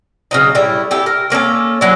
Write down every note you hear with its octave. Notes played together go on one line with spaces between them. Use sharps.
C#3 F#3 D#4
A2 G3 E4
E4 G4 A4
A#4
A3 A#3 C#4 A4
F#3 C#4 D4 E4